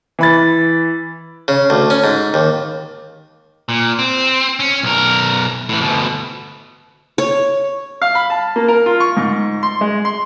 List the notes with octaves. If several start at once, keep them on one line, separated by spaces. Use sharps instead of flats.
E3 B5 A6
C#3
D2
C#4
G#2
D#2
A#2
C4
C#4
B1 A#4
A2 E3
D2 B2
C#5
F5
B5
A5
A#3
A#4
F4
C#6
G#2
C6
G#3
C6